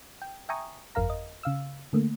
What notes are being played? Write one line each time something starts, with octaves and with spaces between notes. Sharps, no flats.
G5
E5 G5 G#5 A#5 C#6 D#6
G1 F2 A#4 F5 A#5
D#5
C#3 F5 E6
D3 A3 A#3